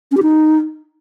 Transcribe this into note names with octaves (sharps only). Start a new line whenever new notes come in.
C#4
G4
D#4